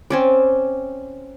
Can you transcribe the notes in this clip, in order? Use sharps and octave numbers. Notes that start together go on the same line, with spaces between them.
C4 C#4 D5